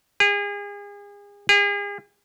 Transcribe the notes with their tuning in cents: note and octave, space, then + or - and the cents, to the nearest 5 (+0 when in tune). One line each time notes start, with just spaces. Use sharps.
G#4 -35
G#4 -40